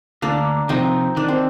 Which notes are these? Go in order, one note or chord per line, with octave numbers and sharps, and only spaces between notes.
D2 A#3 D4
C3 F3 C4 D#4
D#3 D4
C4